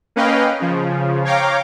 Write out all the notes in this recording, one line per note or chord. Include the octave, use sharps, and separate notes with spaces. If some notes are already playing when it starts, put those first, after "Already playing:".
A#3 C#4 B4 D#5 F5 G5
C#3 F3
C#5 F5 G5 A#5 D6